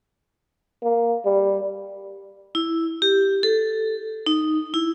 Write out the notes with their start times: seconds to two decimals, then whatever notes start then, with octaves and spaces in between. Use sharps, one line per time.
0.83 A#3
1.25 G3
2.55 E4
3.02 G4
3.43 A4
4.26 D#4
4.74 E4